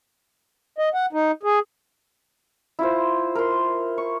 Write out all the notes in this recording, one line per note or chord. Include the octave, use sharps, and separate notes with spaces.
D#5
F#5
D#4
G#4
E4 F4 C5
A#4 C6
C#6